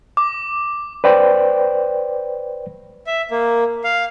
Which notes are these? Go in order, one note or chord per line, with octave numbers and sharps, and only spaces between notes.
D6
B4 C5 D5 G5
E5
A#3
F5